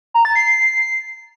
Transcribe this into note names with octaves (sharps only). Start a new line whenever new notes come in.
A#5
A6
C7